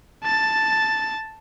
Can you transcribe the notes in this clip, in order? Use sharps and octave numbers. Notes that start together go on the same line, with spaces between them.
A5 A6